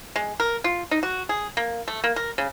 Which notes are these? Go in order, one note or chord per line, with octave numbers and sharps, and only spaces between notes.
G#3
A#4
F4
D#4
F#4
G#4
A#3
A3
A#3
A#4
C#3